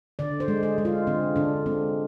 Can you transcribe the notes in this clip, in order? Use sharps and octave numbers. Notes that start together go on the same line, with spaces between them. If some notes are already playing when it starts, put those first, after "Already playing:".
D3 D5
C5
G#3
G#4
G#3
F4
D3 C4
D3 D4
G#3 C4